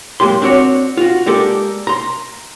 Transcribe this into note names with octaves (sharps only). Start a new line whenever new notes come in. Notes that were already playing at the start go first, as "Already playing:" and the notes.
F#2 G#3 A#3 G4 C6
C4 D4 F#4 C#5
F4 F#4
G#3 A#3 G4 A4 A#4 D5
A#5 C6